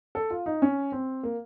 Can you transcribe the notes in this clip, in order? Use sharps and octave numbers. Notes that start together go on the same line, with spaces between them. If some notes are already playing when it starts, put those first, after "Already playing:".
A4
F4
D#4
C#4
C4
A#3